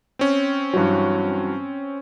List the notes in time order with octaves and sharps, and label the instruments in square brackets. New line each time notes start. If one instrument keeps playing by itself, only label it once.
[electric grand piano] C4 C#4
[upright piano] G2 E3 F#3